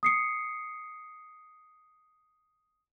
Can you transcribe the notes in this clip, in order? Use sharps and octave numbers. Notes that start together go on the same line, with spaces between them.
D#6 C7 C#7